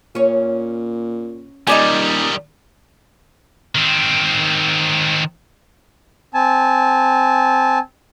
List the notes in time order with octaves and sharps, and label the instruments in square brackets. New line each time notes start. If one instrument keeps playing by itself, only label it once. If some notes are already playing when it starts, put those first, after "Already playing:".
[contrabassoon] A#2 [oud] C#4 C#5
[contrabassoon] D#1 [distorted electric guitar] D#3 G3 [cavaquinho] D#4 D5 G#5
[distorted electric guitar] D#3 C4
[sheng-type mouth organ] C4 G#5 A5